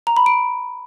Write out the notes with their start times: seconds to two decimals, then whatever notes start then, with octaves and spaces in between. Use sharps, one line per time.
0.07 A#5
0.17 B5
0.26 D7